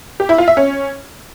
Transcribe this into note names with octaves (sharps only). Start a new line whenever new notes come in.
G4
E4
F4
E5
C#4